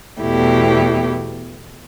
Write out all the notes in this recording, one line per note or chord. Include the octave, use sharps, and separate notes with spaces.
E2 B2 A3 E4 G4